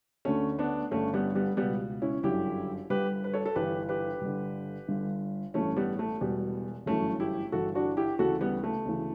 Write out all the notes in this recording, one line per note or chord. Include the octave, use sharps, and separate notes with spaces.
D2 D3 A3 C#4
B3 D4
G1 G2 D3 A3 C#4
G3 B3
G3 B3
C#2 B2 G3 B3
C#4 E4
G1 F#2 D3 E4 G4
G1 G2 D3 G4 B4
B4
A4 C#5
A4
G1 G2 E3 G4 B4
G4 B4
G1 G2 D3
G1 G2 D3
A1 G2 E3 A3 C#4
G3 B3
A3
E1 E2 B2 G3 B3
G1 F#2 E3 A3 C#4
E4 G4
G1 G2 E3 F#4 A4
D4 F#4
E4 G4
D2 C#3 E3 F#4 A4
G3 B3
A3
D2 C#3 E3